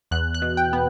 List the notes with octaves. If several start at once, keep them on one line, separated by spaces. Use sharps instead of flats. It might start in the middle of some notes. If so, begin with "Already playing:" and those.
E2 F#6
F#6
B2
G5
B3